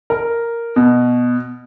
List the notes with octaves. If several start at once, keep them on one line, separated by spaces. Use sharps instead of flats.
A#4
B2